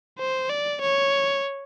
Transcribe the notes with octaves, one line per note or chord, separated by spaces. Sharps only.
C5
D5
C#5